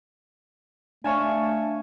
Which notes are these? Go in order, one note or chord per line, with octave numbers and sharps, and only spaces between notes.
A3 D4 C#5 F5 G#5 A5